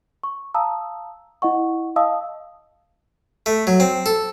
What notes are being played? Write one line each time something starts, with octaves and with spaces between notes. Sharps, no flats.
C#6
F5 A5 A#5 D#6 E6
E4 D#5 F#5 C#6
D#5 F5 A5 D#6 E6
A3
F#3
C4
A4